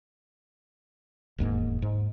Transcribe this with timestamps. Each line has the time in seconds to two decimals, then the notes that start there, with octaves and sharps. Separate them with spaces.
1.38 E1 D#2 G#2 A#3
1.82 G#2